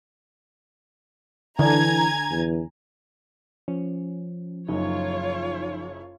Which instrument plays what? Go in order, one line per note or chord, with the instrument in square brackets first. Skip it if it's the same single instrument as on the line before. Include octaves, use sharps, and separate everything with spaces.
[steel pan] D3 D4 [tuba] E3 [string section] G#5 A#5 G#6
[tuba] E2
[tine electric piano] F3 [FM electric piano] C#4
[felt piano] F#1 F#2 [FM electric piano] D#4 [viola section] F4 C#5